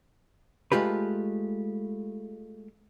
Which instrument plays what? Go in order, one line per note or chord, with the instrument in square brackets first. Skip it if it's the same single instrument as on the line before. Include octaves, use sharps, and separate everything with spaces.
[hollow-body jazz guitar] G#3 A3 F4 G4 B4